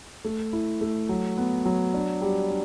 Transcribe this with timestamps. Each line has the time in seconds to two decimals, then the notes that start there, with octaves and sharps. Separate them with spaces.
0.25 A3
0.53 E4
0.81 A3
1.09 F#3
1.38 B3
1.65 F#3
1.94 D4
2.22 G3
2.49 D4